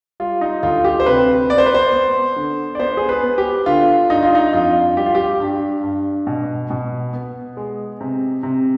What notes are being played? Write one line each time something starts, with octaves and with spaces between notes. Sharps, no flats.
G3 F4
D#4
D2 F4
G4
C5
C3 B4
B3 D5
C5
B4
C5
B3
D3
D5
B3 C5
G#4
B4
B3
G4
D3 F4
G2 D#4
F4
D#4
F2 F4
G3 G4
F4
G4
G2
G2
B2
B2
B3
G#3
C3
C3